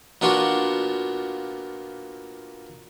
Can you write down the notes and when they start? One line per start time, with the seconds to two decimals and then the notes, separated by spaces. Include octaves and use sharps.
0.21 A#2 B3 D4 F4 F#4